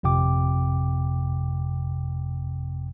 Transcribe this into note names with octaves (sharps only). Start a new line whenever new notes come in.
G1 F2 C3 G5 D6